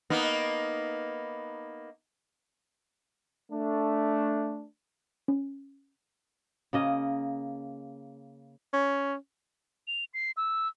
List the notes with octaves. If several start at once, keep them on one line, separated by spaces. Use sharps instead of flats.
A#3 B3 D#4
A3 D4
C#4
C#3 A#3 D#5
C#4
F7
C7
E6